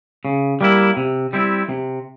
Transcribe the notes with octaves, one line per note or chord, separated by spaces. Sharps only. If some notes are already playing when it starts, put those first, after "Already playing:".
C#3
G3 A#3 E4
C3
G3 C4 E4
C3